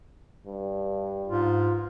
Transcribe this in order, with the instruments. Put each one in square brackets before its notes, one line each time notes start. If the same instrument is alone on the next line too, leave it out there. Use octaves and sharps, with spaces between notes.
[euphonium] G2
[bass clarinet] G#2 [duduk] F4